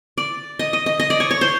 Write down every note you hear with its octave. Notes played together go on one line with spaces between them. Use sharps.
D5
D#5
D#5
D#5
D#5
D5
C#5
C#5
C5